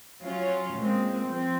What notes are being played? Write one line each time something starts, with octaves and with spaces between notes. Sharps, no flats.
F#3 C#4 F4
A#2 G#3 C4
F3 C4